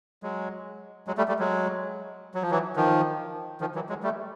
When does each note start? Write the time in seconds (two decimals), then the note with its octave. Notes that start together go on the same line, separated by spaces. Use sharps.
0.23 F#3 G#3
1.07 F#3 G#3
1.18 G3 A3
1.28 G3 A3
1.39 F#3 G#3
2.34 F#3
2.42 F3
2.51 E3 F#3
2.76 D#3 F3
3.61 D#3 F3
3.75 E3 F#3
3.89 F#3 G#3
4.03 G3 A3